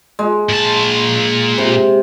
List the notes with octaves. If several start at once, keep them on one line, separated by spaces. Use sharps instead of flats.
G#3
A#2 A5
C3